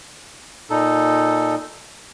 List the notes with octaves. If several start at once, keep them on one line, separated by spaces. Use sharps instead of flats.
A#2 D#4 A4